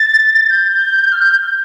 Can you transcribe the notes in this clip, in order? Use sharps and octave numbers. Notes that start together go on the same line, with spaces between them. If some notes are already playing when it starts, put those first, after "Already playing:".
Already playing: A6
G6
F6
G6